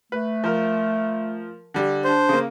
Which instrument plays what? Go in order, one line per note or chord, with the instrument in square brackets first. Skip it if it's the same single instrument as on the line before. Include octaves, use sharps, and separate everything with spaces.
[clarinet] A3 [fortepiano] B4
[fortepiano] F3 A#4
D3 G3
[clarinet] D4 [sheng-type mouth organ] C5
[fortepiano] C#3 A#3